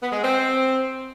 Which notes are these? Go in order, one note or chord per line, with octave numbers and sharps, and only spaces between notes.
B3
G#3
C4